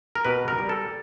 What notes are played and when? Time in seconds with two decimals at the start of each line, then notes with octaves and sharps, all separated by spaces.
0.15 A#4
0.25 B2 B4
0.48 A#4
0.59 G3
0.69 A4